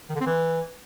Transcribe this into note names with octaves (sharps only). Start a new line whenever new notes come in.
D#3
D3
C4
E3